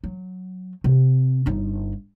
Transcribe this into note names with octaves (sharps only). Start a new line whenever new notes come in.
F#3
C3 C4
G1 D#4